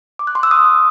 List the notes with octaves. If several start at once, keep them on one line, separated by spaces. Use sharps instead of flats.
D6
F#6
C6
E6
D#6